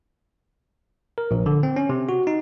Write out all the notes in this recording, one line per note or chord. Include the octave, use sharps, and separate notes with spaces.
A#4
A#1
D3
C4
C#4
C3
F#4
D#4